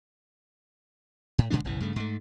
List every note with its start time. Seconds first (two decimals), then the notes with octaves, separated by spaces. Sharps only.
1.38 A2
1.50 A#2 D3 G#3 D4
1.64 F#1 B1 C#3 E3
1.80 G2 C#3 A3
1.96 G#2 A3